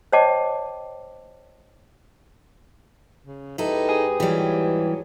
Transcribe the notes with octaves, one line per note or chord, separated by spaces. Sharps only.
C5 C#5 D#5 G5 A5 D6
C#3
G#2 D#4 E4 G4 A4 B4
G#4
E3 F#3 G3